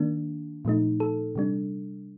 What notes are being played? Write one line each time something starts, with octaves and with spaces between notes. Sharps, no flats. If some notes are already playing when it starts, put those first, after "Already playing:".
Already playing: D#3 A#3 D4
A#2 F3 A3 D#4
A4
C3 G3 D4